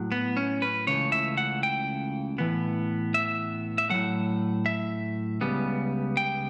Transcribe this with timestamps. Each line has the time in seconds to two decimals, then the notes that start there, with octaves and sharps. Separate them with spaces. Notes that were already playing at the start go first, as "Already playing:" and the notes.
Already playing: A2 F#3
0.12 B3
0.37 C#4
0.62 B4
0.87 C#2 C#3 E3 A3 C#5
1.12 E5
1.37 F#5
1.63 G5
2.38 A2 E3 B3
3.14 E5
3.78 E5
3.90 A2 F#3 A3 F#5
4.66 E5
5.41 C#2 C#3 G3 B3
6.17 G5